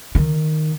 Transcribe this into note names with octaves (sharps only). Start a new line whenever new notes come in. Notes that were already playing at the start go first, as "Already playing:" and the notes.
D#3